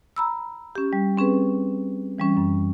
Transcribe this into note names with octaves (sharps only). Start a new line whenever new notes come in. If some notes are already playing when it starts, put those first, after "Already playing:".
A#5 B5 E6
C#4 G4
G3
C4 C#4 G#4 B4
E3 G3 C#4
F#2